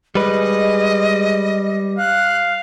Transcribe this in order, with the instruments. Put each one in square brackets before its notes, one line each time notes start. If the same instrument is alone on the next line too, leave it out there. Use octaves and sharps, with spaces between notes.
[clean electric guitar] G3 B4 [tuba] G#3 [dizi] D#5
[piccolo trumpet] F5 [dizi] F#6